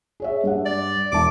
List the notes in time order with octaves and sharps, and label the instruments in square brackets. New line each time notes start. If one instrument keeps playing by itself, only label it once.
[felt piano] G#4 C#5 E5
G2 F#5
[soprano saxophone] D5
[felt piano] E1 E5 A5 [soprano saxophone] D6